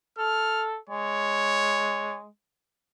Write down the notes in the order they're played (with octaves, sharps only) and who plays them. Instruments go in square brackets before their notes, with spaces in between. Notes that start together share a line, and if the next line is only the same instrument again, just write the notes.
[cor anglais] A4 [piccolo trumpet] F6
[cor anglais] G#3 [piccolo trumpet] C#5